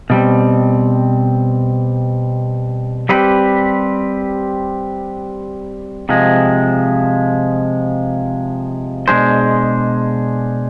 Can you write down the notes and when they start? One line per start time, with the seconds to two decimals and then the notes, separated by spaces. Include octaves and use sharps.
0.10 B2 G3 C4
3.09 G3 C4 G4 B4
6.09 C3 F3 G#3
9.08 B2 G#3 D4 G#4 C5